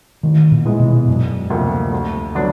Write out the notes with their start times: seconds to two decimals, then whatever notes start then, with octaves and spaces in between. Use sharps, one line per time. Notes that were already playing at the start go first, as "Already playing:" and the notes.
0.23 A1 D#3
0.52 A#2
0.65 G#2 E3 G#3 B3
0.80 B2
1.08 E1 F#2
1.50 D2 C3 F3 A#3
1.93 D2
2.35 D3 F#3 B3 D4